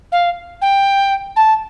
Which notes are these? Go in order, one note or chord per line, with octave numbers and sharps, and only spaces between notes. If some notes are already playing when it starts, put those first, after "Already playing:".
F5
G5
A5